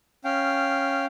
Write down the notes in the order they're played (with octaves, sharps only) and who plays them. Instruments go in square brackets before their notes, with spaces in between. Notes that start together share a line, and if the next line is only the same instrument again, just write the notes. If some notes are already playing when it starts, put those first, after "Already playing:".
[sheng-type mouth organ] C#4 F5 G5